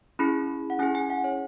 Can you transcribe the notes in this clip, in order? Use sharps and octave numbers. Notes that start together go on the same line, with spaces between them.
C#4 E4 G#4 B5
F#5
C#4 E4 G#4 G#5
G#5
F#5
C#5